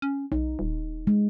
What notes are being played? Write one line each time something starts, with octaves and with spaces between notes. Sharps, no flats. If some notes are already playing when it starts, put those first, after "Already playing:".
C#4
B1 D#4
D#1
G#3